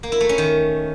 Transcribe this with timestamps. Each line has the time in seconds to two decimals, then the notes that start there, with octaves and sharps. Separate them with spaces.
0.03 A#3
0.12 E4
0.21 A3
0.29 C#4
0.38 D#3